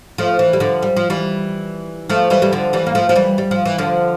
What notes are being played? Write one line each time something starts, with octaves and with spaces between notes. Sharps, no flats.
F3 A3
E3
G3
D3 F3
G3
F3
E3 G3
F3 A3
E3 G3
G3
D3 F3
E3 G3
A#3
F3 A3
F3
E3 G3
G3
F3
E3
D3 F3